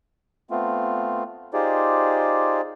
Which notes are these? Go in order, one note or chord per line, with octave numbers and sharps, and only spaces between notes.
A3 B3 C4 F4
D#4 F4 G4 G#4 C5 D5